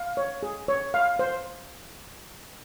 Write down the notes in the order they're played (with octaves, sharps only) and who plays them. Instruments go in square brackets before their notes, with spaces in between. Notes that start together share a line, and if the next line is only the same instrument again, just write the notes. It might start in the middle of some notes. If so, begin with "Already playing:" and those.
Already playing: [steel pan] F5
C#5
G#4
C#5
F5
C5